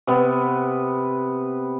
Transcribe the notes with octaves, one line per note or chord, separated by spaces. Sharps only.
C3 B3